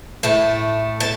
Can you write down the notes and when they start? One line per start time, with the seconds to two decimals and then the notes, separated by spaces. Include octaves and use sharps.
0.23 A2 A3 A5
1.00 A5